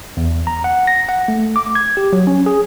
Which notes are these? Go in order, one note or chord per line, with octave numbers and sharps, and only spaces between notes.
E2
A#5
F#5
A#6
F#5
A3
D6
G#6
G4
F#3
C#4
G#4